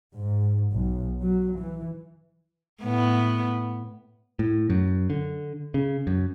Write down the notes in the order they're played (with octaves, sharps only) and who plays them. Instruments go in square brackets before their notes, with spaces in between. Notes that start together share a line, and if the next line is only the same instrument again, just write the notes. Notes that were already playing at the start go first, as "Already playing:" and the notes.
[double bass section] G#2
B1
F#3
E3
[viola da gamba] A2 B3
[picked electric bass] A2
F#2
D3
C#3
F#2